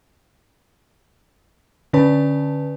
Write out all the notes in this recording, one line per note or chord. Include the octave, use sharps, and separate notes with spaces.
D3 C#4 B4 A5